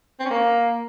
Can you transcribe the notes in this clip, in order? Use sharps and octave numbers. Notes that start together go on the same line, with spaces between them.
C4
C#4
A#3